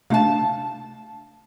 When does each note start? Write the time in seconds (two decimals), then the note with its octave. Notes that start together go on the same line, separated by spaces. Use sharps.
0.10 C3 A3 D4 F5 A5